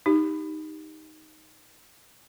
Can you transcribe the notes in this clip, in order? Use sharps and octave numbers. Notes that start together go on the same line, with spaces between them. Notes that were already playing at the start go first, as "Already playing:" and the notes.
D#4 G4